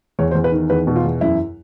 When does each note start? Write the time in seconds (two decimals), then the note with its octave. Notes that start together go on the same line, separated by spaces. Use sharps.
0.19 E2 C#5
0.31 C5
0.35 E2
0.44 B4
0.52 D#3
0.70 E2 B4
0.87 B2
0.96 F4
1.04 E2
1.21 F#2 E4